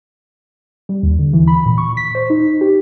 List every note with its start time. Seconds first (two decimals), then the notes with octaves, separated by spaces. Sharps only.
0.89 G3
1.03 D#2
1.19 D3
1.33 E3
1.47 B5
1.66 A#2
1.78 C#6
1.97 B6
2.15 C5
2.30 D#4
2.61 G4